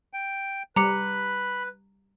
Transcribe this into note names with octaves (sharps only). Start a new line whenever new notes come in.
G5
G3 B4 A#5 B5 D6 C#7